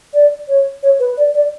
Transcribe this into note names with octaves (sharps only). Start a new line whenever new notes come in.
D5
C#5
C#5
B4
D5
D5